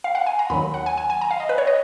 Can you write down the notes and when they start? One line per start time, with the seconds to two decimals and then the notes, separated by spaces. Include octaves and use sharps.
0.04 F5
0.15 F#5
0.26 G#5
0.39 A#5
0.50 D#2 D#3 F#3 B5
0.74 F#5
0.86 G#5
0.98 G#5
1.10 G#5
1.21 A#5
1.31 F5
1.40 D#5
1.49 B4
1.58 C#5
1.67 D#5